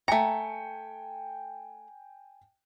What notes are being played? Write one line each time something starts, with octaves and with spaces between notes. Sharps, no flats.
A3 G5 G#5 A#5 C#7